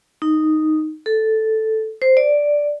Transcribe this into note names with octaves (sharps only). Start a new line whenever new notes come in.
D#4
A4
C5
D5